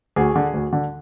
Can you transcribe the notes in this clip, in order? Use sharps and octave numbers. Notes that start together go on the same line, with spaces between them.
D2 F#4 G#4
D3
D2
D3